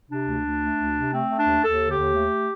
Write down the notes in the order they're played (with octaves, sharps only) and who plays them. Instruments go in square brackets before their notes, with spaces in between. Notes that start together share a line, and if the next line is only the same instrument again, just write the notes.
[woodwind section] C3 D4
D2
D2
A3
D2
C3
A3 C4
A3
D4
D#2
D#2 A4
D3
G4
D#2
A3